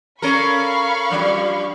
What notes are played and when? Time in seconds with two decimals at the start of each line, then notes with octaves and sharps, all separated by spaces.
0.22 C#4 A4 A#4 F5 B5 C#6
1.10 F3 G3 D4